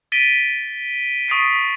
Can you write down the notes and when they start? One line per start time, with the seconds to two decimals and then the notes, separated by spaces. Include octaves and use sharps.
0.12 A6 B6 D7 D#7 G7
1.28 C#6 D#6 A6 B6 C7 D7